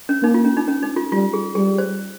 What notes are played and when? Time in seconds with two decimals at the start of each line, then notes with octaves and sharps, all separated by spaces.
0.09 C#4
0.23 A#3 D#4
0.34 F4
0.45 C#4
0.57 D#4
0.68 C#4
0.83 D#4
0.96 F4
1.12 G3 F4
1.33 G#4
1.55 G3 G#4
1.78 C5